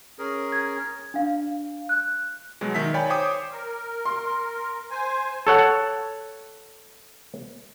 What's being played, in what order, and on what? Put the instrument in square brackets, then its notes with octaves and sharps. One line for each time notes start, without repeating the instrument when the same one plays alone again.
[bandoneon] C#4 G#4 A#4
[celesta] G#6
D4 F5
F#6
[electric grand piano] B2 F#3 G#3
D#3 E5 B6
C#5 D5 G5 G#5 B5
C5 C#5 G5 D6 D#6
[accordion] A#4
[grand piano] C6
[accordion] C5 G#5
[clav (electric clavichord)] A4 C#5 F#5